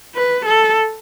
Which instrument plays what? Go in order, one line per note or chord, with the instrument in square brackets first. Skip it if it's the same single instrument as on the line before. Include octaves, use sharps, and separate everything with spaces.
[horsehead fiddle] B4
A4